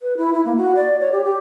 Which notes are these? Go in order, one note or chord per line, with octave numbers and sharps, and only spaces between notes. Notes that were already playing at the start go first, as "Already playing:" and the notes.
B4
E4
E4
A#3
F#4
D5
C#5
G4
G4